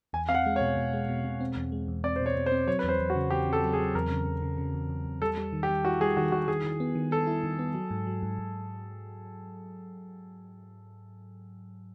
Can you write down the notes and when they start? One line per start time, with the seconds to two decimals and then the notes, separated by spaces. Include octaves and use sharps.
0.13 E2 G#5
0.29 C4 F5
0.35 F#5
0.46 G#3
0.56 B2 C#5
0.77 B2
0.93 G#3
1.08 B2
1.25 B2
1.40 C4
1.57 E2
1.72 G#3
1.88 E2
2.04 C4 D5
2.16 B2 C5
2.26 C#5
2.36 B2
2.46 C5
2.52 C4
2.67 F#3 C#5
2.79 E2 B4
2.89 C5
2.99 E2
3.10 F#4
3.15 C#3
3.30 E2 G4
3.47 C#3
3.53 A4
3.63 F#3
3.73 G#4
3.79 F#3
3.95 E2 A#4
4.11 C#3
4.26 C#3
4.42 C#3
4.58 C#3
4.74 E2
4.89 E2
5.05 E2
5.21 G3 A4
5.37 G3
5.53 D#3
5.63 G4
5.69 G3
5.85 E4 F#4
6.01 G3 G#4
6.17 D#3 F#4
6.32 D#3 F#4
6.48 D#3 G#4
6.65 D#3
6.80 B3
6.95 D#3
7.11 B3 A4
7.27 E4
7.44 D#3
7.59 B3
7.74 F#3
7.91 G#2
8.07 F#3
8.23 G#2
8.39 G#2